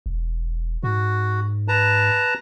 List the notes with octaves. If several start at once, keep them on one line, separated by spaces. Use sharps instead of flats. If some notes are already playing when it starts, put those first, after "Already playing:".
E1
G#2 F#4
B4 A5 A#5